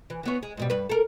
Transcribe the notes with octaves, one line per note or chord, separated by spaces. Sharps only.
E3
E3 B3 C#5
G#3
G#2 B2 G3
G2 B4
A4 A#4